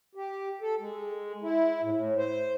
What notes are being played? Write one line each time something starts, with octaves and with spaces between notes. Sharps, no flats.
G4
A4
G#3
E4
A2
A2
C5